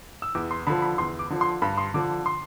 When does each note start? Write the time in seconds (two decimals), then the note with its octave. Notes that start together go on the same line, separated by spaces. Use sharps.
0.22 E6
0.35 E2 D6
0.51 C6
0.67 D3 F3 B5
0.82 B5
0.98 E2 C6
1.19 D6
1.30 D3 F3
1.41 C6
1.62 G2 B5
1.78 C6
1.94 D3 F3 D6
2.26 C6